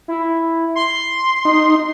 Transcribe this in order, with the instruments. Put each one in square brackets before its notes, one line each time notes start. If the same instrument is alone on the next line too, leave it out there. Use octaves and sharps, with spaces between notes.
[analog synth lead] E4
C6
[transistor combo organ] D#4